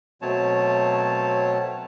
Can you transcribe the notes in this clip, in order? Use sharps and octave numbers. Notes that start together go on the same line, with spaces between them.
B2 F#3 A3 C4 C#5 A5